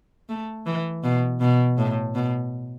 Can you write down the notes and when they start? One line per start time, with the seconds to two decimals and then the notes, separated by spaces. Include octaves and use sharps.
0.29 A3
0.66 E3
1.04 B2
1.40 B2
1.78 A2
2.15 B2